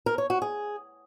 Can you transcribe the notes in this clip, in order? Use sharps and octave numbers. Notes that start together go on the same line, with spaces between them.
A#4
C#5
F#4
G#4